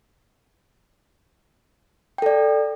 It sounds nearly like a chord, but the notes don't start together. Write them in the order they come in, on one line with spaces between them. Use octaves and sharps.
G5 A4 D5